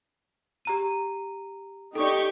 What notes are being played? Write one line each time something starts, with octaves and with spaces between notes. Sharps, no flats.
G4 A#5 D#7
D#4 G4 A4 D5 C#6